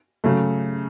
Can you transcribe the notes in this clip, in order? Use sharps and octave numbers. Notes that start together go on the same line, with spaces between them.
C#3 F#3 A3